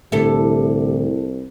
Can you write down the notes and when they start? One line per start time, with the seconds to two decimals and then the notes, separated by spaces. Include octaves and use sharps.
0.12 C2 A2 D3 A3 E4 G4 A4